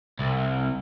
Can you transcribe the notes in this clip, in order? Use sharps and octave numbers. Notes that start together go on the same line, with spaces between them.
C2